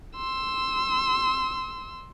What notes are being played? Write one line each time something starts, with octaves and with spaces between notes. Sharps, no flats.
C6 E6